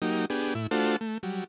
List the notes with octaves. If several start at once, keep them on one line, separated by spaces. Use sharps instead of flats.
F#3 A#3 D#4 G4
B3 D4 G4 G#4
A2 E4
A3 D4 F4 F#4 A4 C5
A3
F#3 G3